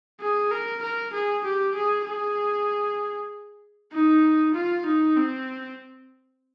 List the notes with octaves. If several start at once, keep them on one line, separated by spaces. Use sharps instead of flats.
G#4
A#4
A#4
G#4
G4
G#4
G#4
D#4
F4
D#4
C4